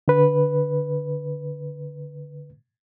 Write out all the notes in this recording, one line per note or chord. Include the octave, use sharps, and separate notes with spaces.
D3 B4